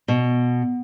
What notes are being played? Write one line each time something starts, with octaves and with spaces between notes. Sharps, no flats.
B2